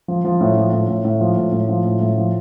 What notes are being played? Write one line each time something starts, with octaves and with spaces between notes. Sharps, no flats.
F3
F3
A2
F3
A2
A2
A2
F3
A2
A2
F3
A2
A2
F3